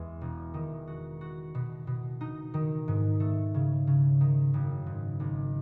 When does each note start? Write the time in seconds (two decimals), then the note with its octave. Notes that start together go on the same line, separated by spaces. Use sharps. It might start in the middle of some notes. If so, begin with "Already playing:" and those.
Already playing: E2 G#3
0.21 E1
0.54 D#3
0.87 F#4
1.21 F#4
1.55 B2
1.87 B2
2.21 D#4
2.54 D#3
2.88 G#2
3.20 A3
3.54 C#3
3.87 C#3
4.21 D#3
4.54 F#1
4.86 G#2
5.20 G#1